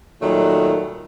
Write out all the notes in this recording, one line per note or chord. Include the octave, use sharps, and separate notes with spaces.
A#2 D#3 F#3 G3 A3